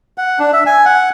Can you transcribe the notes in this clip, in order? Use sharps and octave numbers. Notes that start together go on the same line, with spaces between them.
F#5
D4
E5
G#5
F#5